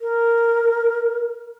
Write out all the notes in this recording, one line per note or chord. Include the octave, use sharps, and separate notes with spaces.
A#4